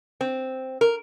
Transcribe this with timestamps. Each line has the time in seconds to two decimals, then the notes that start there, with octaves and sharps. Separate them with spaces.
0.21 C4
0.81 A#4